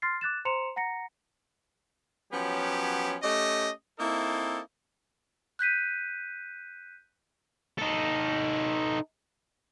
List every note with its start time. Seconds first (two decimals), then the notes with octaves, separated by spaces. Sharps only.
0.02 C6 F6 A6 C7
0.21 D6 F#6 A6 E7
0.45 C5 A#5 C6 C#7 E7 F7
0.76 F#5 A#5 A#6 C#7
2.32 F3 F#3 B3 C#4 G4
3.23 A3 C#4 G4 D#5
3.99 A#3 C4 D#4 E4 A4
5.59 F#6 G6 B6 D#7
7.78 D#4 A4